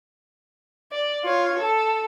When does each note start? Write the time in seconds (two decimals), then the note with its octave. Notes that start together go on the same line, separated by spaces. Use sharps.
0.92 D5
1.24 F4 C#5
1.59 A4